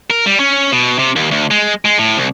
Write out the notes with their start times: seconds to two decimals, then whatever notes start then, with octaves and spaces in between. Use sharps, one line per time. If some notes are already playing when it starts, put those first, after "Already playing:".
0.10 A#4
0.26 G3
0.40 C#4
0.72 B2
0.99 C3
1.16 D#2
1.31 D2
1.51 G#3
1.85 G#3
1.99 A2
2.17 C2